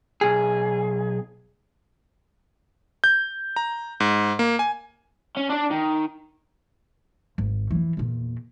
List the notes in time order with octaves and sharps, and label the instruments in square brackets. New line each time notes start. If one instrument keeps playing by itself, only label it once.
[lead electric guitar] B1 G#4
[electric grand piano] G6
A#5
G#2
A#3
G#5
[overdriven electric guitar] C#4
D4 D5
D#3
[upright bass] G#1
F2 E3
E2 A#2